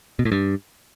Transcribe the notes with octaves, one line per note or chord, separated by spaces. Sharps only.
B2
A2
G2